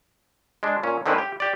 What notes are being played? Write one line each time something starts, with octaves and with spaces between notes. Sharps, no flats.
G#3 D4
A#2 C#4
D3 D#3 C4 C#4 E4 B4
G4
G4 D5